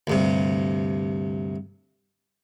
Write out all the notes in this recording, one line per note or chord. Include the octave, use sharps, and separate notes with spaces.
D2 G2 C3